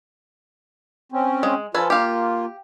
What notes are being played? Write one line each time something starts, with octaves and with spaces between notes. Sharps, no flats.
C4 C#4
G#3
F3 F4 A4 B4 G#5
A#3 F4 G4 F5